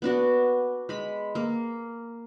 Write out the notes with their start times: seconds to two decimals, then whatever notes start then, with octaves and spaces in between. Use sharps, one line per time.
0.02 B3 D4 F#4
0.89 G#3 B5
1.35 A#3